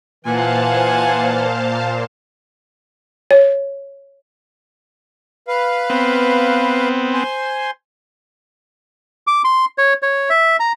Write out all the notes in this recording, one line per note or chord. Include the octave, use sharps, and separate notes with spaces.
A#2 E3 C5 F5 F#5 G#5 A5
C#5
B4 F5
B3 C4
C5 G#5 C6
D6
C6
C#5
C#5
E5
A#5